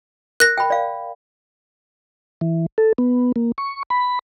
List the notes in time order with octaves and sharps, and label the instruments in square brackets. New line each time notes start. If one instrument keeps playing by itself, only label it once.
[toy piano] A#4 [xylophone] F#6 A#6
[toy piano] G5 B5
D5 F5
[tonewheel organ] E3
A4
B3
A#3
C#6
B5